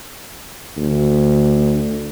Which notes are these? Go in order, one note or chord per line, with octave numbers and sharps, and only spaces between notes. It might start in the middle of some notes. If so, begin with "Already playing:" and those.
D2